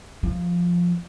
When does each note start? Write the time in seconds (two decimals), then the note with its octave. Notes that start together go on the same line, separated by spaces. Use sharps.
0.23 F3